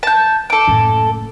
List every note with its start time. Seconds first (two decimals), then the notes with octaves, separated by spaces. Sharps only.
0.03 A5 G6
0.50 A4 D6
0.68 F#1 A2